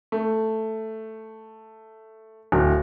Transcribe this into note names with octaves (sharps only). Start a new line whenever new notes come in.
A3
D1